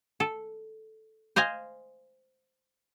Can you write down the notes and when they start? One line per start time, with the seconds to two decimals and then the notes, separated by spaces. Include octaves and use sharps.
0.20 A4
1.36 C5 D#5 F5 G#5